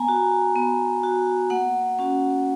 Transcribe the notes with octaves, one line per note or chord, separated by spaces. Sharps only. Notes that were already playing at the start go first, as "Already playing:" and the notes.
Already playing: B3 G#5 A#5
F#4
B3
F#4
A#3 F#5
C#4 F#4